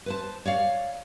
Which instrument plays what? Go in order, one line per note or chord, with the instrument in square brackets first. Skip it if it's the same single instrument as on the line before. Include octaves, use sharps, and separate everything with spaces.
[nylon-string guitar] B4 C5 A5
C#5 D5 F5